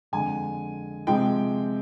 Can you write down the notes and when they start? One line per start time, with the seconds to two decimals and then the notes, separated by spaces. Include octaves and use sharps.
0.12 F2 D3 G#3 G#5
1.07 C3 F3 G#3 G5